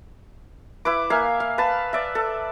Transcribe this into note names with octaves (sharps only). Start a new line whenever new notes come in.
E4 B4 D6
A#3 E5 F5 G#5
F5
B4 A5
D5 E5
A4